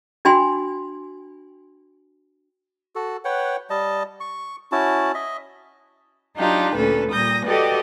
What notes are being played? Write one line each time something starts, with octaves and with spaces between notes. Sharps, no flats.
D4 F#4 G5 G#5 B5 C6
F#4 A4
B4 C#5 F#5 G5
G3 D#5 A5
C#6
C#4 E4 F#4 A5
D#5 E5
F#3 D4 D#4 F4 G4
D2 A#2 C#4 A4 B4
A#2 G3 D#6 G6 A#6
F#4 G4 A4 B4 D5 D#5